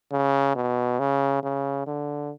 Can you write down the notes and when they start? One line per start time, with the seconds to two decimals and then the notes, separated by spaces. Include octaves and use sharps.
0.12 C#3
0.55 B2
0.99 C#3
1.43 C#3
1.87 D3